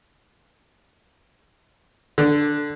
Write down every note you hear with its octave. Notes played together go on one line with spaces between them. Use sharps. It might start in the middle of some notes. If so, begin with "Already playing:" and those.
D3